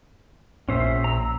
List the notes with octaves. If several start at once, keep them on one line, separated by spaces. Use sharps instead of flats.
A#1 A#2 A#3 C#4 C5 E5
A#5 E6